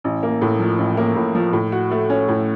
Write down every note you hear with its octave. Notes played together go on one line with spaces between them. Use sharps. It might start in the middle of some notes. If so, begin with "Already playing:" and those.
A1
A#3
A2
F3
A1
A#3
A2
F3
A2
F#4
A3
C#4
A2